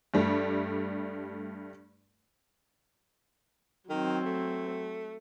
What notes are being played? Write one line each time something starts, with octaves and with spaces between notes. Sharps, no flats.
G2 G3 A3
D#3 F#3 C4
A3